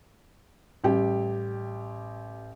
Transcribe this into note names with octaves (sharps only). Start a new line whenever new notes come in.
A1 G3 G4 G5